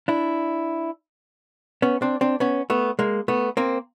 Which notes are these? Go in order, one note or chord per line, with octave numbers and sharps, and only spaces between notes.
D4 E4
B3 C#4
C4 D4
C4 D4
B3 C#4
A3 B3
G#3 A#3
A3 B3
A#3 C4